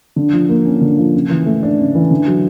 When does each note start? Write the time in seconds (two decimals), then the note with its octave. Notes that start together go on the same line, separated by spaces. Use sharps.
0.16 D3
0.33 F3
0.49 A#3
0.65 C#4
0.81 D3
0.98 F3
1.14 C#3
1.30 E3
1.46 A3
1.63 D4
1.79 C#3
1.95 E3
2.11 D3
2.27 F#3